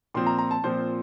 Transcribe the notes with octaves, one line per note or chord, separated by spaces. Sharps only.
A#2 F3 C4 C6
A#5
A#5
A5
A#2 F3 C4 C5